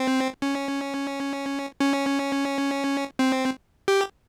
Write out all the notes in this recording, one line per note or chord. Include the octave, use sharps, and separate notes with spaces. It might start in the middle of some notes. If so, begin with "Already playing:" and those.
Already playing: C4
C#4
C#4
C4
G4